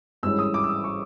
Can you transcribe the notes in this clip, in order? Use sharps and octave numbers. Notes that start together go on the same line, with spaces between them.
G#1 G2 E3 G#3 C#4 E6
D#6
D6
E6
D#6
C#6